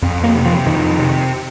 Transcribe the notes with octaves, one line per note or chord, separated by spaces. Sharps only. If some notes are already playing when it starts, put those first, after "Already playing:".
F2
A#3
C3
F3
F2 D#3
C3